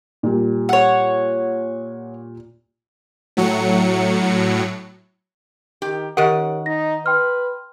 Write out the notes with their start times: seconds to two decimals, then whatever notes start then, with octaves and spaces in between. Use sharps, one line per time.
0.23 A#2 G3
0.69 C#5 F#5
3.37 A2 F#3 C#7
5.82 D#3 G4
6.17 D#3 C#4 G4 A#4 F#5 D7
6.66 D#4 A#6
7.06 B4 G5 C6 F6